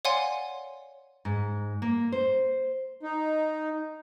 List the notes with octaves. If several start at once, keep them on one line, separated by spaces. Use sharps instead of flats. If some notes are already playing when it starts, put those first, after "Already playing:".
C#5 D5 F5 F#5 G#5 C6
G#2
A#3
C5
D#4